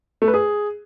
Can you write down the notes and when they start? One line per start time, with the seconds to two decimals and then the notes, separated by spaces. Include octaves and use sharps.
0.22 A3
0.28 B4
0.34 G#4